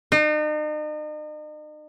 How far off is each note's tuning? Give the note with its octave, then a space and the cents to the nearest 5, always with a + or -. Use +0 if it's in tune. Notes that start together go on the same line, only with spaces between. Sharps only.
D#4 -40